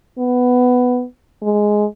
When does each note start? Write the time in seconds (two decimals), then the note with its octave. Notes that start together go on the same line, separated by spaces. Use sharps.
0.18 B3
1.42 G#3